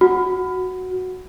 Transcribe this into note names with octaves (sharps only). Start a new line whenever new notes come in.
F#4